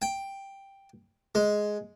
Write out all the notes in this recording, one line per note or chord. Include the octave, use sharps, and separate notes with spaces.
G5
G#3